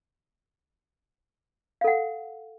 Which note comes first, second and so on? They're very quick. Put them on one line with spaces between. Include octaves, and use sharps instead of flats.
F5 A4 F#5